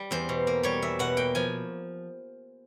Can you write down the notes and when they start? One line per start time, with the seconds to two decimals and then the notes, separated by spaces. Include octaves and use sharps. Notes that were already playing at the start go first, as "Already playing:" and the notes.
Already playing: G3
0.11 E2 C5
0.29 B2
0.47 A#3
0.63 G3 C#5
0.82 E2 E5
0.99 B2 F#5
1.17 A#3 G5
1.35 F3 G#5